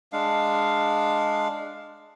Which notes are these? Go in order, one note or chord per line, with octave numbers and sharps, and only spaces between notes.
G#3 D4 F5